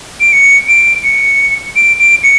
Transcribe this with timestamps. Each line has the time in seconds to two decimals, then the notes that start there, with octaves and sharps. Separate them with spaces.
0.21 D7
0.33 C#7
0.68 D7
1.04 C#7
1.76 D7
1.99 D7
2.23 C#7